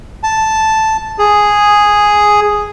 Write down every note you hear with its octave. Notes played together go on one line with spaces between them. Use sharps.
A5
G#4